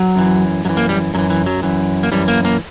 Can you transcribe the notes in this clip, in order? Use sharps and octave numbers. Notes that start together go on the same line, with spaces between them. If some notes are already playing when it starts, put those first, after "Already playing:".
Already playing: F#3
F#2 E3
F#2 E3 F#3
A#3
G3
F#2 E3 F#3
E3
F#3
F#2 E3
A#3
F#2 E3 G3
A#3
A#3